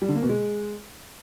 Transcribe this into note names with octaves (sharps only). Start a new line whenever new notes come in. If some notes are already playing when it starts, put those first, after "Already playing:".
G3
D3
A#3
B2
G#3